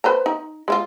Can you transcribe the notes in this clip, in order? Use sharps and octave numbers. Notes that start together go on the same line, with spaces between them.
B4 C5 A#5
D#4
G#3 E4 F4